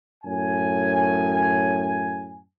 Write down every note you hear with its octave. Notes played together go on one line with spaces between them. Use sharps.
F#2 A2 G#5